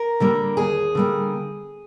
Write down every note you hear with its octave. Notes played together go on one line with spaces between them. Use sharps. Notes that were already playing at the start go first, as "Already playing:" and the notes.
Already playing: A#4
D3 G3 A#3
D#2 G#4
D3 G3 A#3